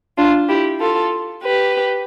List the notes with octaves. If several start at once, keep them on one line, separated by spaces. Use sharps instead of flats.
D4 F4
E4 G4
F4 A4
G4 B4